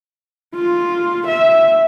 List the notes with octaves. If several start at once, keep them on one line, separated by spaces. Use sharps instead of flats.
F4
E5